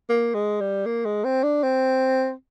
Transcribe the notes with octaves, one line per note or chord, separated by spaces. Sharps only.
A#3
G#3
G3
A#3
G#3
C4
D4
C4